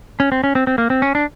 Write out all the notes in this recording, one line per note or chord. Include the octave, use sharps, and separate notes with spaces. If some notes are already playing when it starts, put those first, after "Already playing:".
C#4
C4
C#4
C4
C4
A#3
C4
C#4
D4